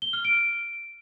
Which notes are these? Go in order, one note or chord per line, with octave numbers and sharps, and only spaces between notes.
G7
F6
D7